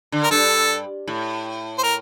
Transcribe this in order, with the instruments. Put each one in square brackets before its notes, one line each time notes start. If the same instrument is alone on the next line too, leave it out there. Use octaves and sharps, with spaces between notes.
[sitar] D3
[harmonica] A#4
[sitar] G2 [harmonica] A4
[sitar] A2
[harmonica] C5
A#4